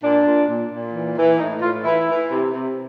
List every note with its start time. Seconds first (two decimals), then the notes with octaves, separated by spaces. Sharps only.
0.01 A#2 D4
0.24 A#2
0.47 A#2
0.69 A#2
0.93 E3
1.16 E3
1.38 A2 D#4
1.61 A2 F4
1.84 E3 E4
2.07 E3
2.30 C3
2.53 C3